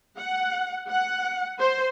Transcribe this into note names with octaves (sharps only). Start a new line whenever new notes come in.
F#5
F#5
C5